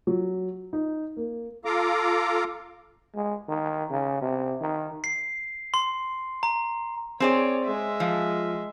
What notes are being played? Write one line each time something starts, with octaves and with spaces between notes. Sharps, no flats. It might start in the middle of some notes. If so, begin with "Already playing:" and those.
F#3
D#4
A#3
F4 A4 F5 A#5 D6
G#3
D#3
C#3
C3
D#3
C7
C6
A#5
C4 G#4 C#5 D5
G#3 E5
F3